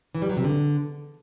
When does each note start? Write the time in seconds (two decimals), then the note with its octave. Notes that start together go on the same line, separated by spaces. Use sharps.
0.15 E3
0.22 G3
0.29 F#3
0.37 C3
0.44 D3